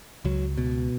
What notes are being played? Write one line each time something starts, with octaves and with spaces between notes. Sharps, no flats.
C#2 F#3
B2